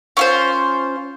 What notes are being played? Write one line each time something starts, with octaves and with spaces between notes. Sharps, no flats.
C#4 F4 C5